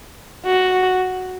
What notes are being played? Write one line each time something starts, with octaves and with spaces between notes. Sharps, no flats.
F#4